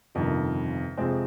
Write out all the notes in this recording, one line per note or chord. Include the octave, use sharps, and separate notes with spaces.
G1 F2 C3 D#3
F2 C3 F3 G#3 C4